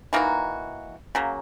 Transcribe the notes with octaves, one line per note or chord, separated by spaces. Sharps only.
E3 A#3 D#4 F#4
C#3 F#3 A#3